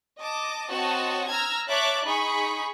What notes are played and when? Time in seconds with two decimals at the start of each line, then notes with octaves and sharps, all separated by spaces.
0.18 D#5 A5 D6
0.70 C4 F#4 C#5 D#5 A5
1.30 A#5 E6 F6 G#6
1.68 C#5 E5 A5 D6 F#6 A6
2.05 D#4 G#4 B5 C#6